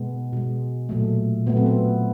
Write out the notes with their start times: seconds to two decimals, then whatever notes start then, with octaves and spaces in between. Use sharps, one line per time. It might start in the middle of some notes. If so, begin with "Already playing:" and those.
Already playing: B2 G#3 B3
0.33 B2 G#3
0.89 A#2 F#3 A3
1.46 A#2 F#3 A3 B3
1.57 C4
1.66 B3